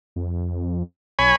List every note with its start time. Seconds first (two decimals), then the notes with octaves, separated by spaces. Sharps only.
0.16 F2
1.19 B1 C#5 G#5 B5